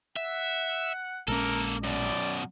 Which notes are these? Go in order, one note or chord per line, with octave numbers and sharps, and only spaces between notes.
E5 F#5
A#1 G#3 A#3 C#4 A4 A#4
F#2 B2 D5